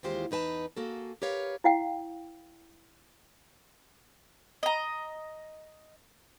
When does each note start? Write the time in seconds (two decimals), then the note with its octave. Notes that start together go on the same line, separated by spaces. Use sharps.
0.03 D#2 E3 G#3 F4 G4 C5
0.31 E2 D#4 B4 G#5 A5
0.77 A#3 F#4 G#4 A4
1.22 G4 A#4 B4 C#5 F5
1.64 E4 F5 G5
4.63 D#5 A#5